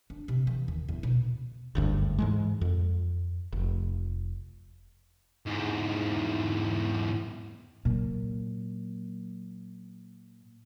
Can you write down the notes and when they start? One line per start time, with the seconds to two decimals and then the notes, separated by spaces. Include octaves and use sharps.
0.10 D4
0.28 C3
0.47 E3
0.68 D#2
0.89 E2
1.03 B2
1.75 F#1 D2 G2
2.19 G#2 E3 G#3
2.61 F2
3.53 F1
5.46 E2 G#2
7.85 A#2 F#3